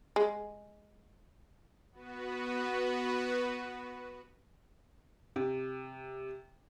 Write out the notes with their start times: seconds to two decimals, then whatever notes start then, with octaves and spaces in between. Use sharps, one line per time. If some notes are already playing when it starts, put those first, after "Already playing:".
0.16 G#3
1.92 B3 F#4 B4
5.36 C3